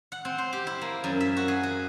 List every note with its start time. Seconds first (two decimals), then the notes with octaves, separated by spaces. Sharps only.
0.12 F#5
0.25 C4
0.38 C5
0.53 G4
0.67 E4
0.81 A#3
1.04 F#2
1.20 E5
1.37 F#4
1.48 G#4
1.63 F#4